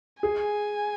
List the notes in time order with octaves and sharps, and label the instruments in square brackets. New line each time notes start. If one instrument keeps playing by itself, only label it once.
[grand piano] G#4 [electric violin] G#5